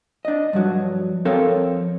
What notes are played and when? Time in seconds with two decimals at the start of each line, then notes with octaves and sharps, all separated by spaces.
0.25 D4 D#5
0.53 G2 F3 F#3
1.25 F2 C4 A4 A#4 C#5 F5